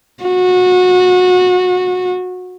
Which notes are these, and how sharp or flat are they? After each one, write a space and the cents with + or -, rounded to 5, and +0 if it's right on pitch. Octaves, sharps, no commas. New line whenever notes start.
F#4 -25